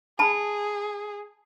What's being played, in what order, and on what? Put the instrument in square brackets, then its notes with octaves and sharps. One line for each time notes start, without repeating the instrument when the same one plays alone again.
[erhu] G#4 [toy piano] A5 B5